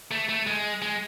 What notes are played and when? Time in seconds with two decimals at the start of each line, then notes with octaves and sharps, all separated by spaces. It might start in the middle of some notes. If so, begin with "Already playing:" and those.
0.11 A3
0.29 A3
0.47 G#3
0.82 G#3